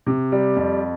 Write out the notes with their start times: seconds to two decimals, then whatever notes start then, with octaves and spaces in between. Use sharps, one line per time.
0.07 C3
0.32 G3
0.56 F2